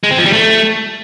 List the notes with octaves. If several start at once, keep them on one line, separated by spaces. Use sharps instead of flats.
G#3
C4
F3
G3
A3